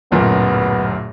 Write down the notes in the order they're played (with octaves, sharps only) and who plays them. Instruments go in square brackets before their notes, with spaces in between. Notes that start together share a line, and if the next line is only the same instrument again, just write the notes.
[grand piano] D1 F#2 A#2 [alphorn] B3